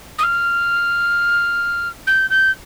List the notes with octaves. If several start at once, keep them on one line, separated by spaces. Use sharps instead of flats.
D#6
F6
G6
G6